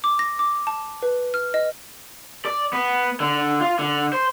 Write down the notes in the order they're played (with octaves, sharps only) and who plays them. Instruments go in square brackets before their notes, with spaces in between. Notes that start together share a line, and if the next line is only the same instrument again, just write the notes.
[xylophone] D6
A#6
D6
A5
B4
F6
D#5
[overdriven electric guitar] D5
B3
D3
F4
D3
C5